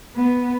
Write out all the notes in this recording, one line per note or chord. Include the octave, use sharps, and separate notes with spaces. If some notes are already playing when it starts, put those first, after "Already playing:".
B3